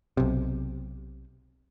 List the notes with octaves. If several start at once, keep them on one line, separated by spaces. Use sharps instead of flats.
B1 C3